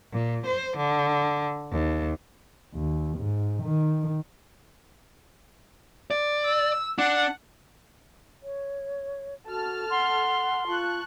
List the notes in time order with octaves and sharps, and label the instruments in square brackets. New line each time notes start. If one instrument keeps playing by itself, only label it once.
[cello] A#2
C5
D3
D#2
[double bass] D#2
G#2
D#3
[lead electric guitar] D5
[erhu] E6
[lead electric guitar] D4 [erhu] F#5
[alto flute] C#5
[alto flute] F#4 [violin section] A4 A5 F6
[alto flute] F#5 [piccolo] C6
[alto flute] F4 [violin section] A5 C#6 F#6